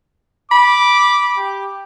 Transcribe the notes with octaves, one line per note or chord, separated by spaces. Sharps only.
B5 D6
G4